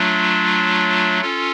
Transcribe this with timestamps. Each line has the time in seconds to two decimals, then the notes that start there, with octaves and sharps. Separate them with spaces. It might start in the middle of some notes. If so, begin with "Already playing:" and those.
Already playing: F#3 A3 D4 F4
1.21 C#4 F4 A4